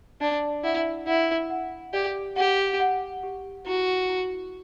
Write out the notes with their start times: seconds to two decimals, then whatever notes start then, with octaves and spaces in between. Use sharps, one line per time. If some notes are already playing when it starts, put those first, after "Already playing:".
0.21 D4 D5
0.64 E4 F#5
1.07 E4 F#5
1.50 F#5
1.93 G4 D5
2.36 G4 F#5
2.80 F#5
3.23 G4
3.66 E4 F#4
4.09 E4